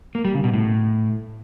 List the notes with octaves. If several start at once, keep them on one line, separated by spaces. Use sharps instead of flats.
A#3
G3
C#3
B2
A2